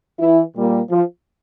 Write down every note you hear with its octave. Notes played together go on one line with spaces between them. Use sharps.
E3 E4
A#2 G3 A#3
F3 F4